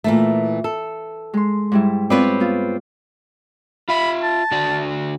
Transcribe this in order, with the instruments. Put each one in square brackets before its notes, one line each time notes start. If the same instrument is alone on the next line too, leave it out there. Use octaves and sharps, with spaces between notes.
[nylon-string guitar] A#2 E3 A3
A4
[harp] G#3 C6
G#2 G3 E4
[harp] B3 F4 D5 [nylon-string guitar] C4 B4 C#5
[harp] B3 F4
[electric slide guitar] F4 E5 [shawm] B5
[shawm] A5
[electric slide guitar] D3 F#4 D5